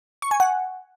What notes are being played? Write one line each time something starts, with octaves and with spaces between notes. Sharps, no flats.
C#6
G#5
F#5